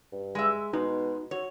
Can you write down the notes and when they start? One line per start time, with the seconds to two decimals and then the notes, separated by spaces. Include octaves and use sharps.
0.12 G2
0.35 G#3 E5
0.73 B2 G#3 D#4
1.31 F#4 C#5